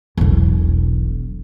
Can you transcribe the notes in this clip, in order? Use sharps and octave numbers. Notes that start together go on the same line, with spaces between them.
E1 B1